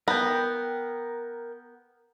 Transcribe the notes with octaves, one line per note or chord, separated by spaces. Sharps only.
B3 A#4 G5